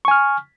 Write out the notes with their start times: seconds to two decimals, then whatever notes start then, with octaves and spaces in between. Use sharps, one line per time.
0.05 C#6
0.08 G#5
0.11 F6